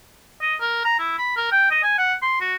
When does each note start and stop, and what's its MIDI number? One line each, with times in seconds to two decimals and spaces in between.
0.42 0.55 75
0.61 0.85 70
0.85 0.97 82
0.99 1.15 64
1.18 1.35 83
1.36 1.49 70
1.52 1.67 79
1.71 1.79 75
1.83 1.94 80
1.98 2.14 78
2.22 2.39 84
2.41 2.55 66